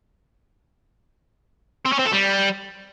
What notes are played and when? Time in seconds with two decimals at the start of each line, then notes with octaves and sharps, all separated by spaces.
1.86 C4
1.92 C#4
1.99 C4
2.06 A4
2.13 G3